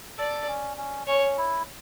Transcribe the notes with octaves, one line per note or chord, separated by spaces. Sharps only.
A4 D5
C#4
C#4
C#4 C#5
E4